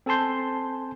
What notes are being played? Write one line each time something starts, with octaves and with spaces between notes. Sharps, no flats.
C4 A4 G#5 A5 C6 G6